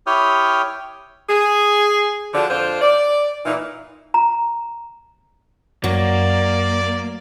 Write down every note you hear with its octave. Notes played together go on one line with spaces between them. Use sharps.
E4 G4 C#5 G5 D#6 F6
G#4
D3 F3 D4 F#4 D5
F2 D4 F4 C5
D5
A#2 E3 D#4
A#5
F#2 F#3 A#3 D5